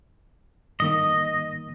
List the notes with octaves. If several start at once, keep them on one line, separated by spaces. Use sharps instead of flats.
G2 D#3 A#3 D#5